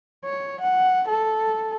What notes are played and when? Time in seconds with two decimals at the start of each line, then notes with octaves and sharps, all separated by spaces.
0.24 C#5
0.60 F#5
1.07 A4